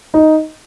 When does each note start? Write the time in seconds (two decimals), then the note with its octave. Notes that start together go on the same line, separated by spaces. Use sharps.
0.14 D#4